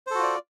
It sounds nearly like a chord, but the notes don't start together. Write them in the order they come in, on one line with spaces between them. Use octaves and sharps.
C5 A4 F#4 F4 D5